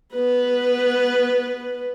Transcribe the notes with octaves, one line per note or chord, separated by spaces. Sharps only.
B3 B4